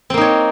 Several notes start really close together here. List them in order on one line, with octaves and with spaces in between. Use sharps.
C4 A#3 D#4 C#5